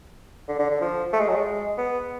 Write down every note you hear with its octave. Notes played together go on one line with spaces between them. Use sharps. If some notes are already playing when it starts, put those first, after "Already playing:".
D3
D3
D3
F3
A3
G#3
F#3
G#3
B3